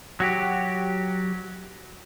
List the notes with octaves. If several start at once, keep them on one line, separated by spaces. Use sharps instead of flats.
F#3 F#4 G4